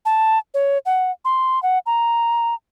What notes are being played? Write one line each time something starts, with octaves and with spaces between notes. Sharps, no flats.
A5
C#5
F#5
C6
F#5
A#5